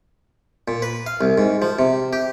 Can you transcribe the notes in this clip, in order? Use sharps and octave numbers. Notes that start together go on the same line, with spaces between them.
A#2
B4
F5
C2
G#2
F3
C3
G4